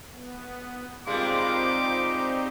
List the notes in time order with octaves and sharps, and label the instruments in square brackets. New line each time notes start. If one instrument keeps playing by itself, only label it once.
[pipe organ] B3
[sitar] A#2 G3 G#3 [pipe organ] C4 D#4 G4 [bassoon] F4 [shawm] D6